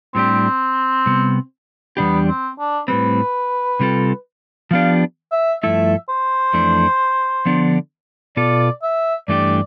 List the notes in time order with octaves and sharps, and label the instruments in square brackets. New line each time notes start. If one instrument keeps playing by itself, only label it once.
[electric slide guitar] A2 G3 D4 G4 [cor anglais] C4
[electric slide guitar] C3 G3 B3
[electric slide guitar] E2 B2 G3 D4 G4 [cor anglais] B3
[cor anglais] C4
D4
[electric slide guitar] A2 G3 C4 [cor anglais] B4
[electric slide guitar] C3 G3 C4 F4 A4
[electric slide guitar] F3 B3 D4 G4 [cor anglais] F5
[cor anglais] E5
[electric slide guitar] G2 F3 A3 E4 A4 [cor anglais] E5
[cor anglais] C5
[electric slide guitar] F2 E3 A3 D4
D3 F3 B3 D4
[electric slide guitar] B2 B3 F4 A4 [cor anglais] D5
[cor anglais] E5
[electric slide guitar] G2 E3 A3 D4 G4 [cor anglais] D5